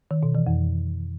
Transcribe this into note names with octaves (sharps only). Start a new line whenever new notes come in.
D#3
B2
E3
F2